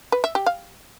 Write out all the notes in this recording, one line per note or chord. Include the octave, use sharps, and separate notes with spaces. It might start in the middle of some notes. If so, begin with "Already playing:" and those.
B4
E5
G4
F5